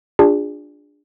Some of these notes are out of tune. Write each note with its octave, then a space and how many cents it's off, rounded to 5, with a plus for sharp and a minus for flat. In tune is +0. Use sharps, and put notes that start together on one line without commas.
D4 +0 F4 +15 G#4 -30